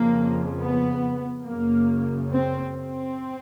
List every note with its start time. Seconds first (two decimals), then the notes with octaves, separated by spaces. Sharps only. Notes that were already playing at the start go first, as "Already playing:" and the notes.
Already playing: F2 C#3 A#3
0.59 B3
1.45 F#2 C#3 A#3
2.31 C4
2.73 C4